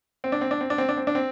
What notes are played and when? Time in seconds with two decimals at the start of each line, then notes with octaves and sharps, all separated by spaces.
0.24 C4
0.32 D4
0.41 C4
0.51 D4
0.61 C4
0.70 D4
0.78 C4
0.89 D4
0.97 C4
1.07 D4
1.15 C4